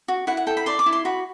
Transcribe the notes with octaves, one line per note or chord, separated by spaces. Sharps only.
F#4
E4 F#5
F#5
A4 G5
B5
D5 C6
D6
E4
C6
F#4 B5